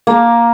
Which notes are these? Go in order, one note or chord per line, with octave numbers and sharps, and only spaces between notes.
A#3